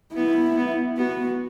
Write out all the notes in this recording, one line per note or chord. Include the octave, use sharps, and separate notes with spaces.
B3 E4
B3
B3 F#4